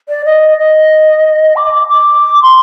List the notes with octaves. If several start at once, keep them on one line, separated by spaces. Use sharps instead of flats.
D5
D#5
D#5
D6
D6
C6